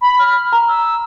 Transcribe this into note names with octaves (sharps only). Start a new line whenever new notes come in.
B5
F6
A#5
E6